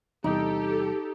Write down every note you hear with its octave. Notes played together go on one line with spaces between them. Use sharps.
E2 C3 G3 D#4 G4 A4